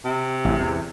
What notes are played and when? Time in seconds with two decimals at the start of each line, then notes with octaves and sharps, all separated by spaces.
0.05 C3
0.45 A1 G#2
0.60 E2